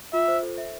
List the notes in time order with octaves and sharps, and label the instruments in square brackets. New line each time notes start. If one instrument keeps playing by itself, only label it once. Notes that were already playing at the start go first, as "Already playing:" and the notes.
[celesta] F4 [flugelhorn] E5
[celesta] C5
A4
E5